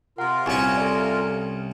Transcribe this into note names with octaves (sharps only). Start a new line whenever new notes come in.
C3 F4 A#4 F#5 C6
C2 C#4 G#5 C#6
A4 D5